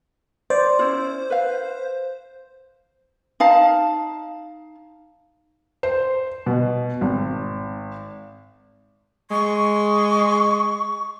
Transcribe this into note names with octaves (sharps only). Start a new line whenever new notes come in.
C5 D5
C#4 E4 F4
B4 F5
D#4 F5 A5
C5
B2
G#1
G#3 C#6